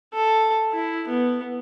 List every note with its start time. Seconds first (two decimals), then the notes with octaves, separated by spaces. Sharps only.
0.14 A4
0.73 E4
1.08 B3